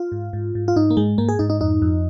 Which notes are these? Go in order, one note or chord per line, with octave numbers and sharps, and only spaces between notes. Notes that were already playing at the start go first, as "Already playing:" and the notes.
Already playing: F4
G#2
G#2
G#2
F4
G#2 D#4
A#3
G#2 G#3
G#2 A#3
G#4
G#2 D#4
D#4
F2 D#4
F2